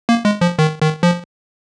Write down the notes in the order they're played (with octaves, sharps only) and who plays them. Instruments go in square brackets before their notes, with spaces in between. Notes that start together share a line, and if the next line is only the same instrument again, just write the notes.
[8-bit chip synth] A#3
G#3
F3
D#3
D#3
F3